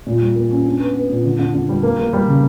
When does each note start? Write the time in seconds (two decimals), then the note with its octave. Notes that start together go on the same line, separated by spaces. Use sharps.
0.06 A#2
0.21 G3
0.36 A#3
0.51 C#4
0.66 D4
0.80 B3
0.95 B3
1.10 A#2
1.24 D3
1.39 D3
1.54 D3
1.69 G3
1.83 A#3
1.99 A#3
2.13 G3
2.28 C#3